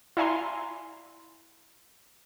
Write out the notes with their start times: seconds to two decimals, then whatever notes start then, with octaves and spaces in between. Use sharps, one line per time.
0.17 E4 D5 F5 G#5 A#5 C6